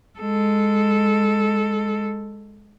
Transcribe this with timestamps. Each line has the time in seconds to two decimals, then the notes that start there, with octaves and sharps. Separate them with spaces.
0.19 G#3 A4